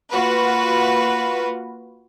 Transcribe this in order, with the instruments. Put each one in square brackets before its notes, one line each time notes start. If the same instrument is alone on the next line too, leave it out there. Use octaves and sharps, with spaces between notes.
[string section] A#3 F4 F#4 B4